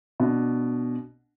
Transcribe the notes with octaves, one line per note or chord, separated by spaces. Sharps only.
B2 D4